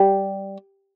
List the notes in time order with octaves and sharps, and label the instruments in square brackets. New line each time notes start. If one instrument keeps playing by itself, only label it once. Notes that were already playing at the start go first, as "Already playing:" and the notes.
Already playing: [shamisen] G3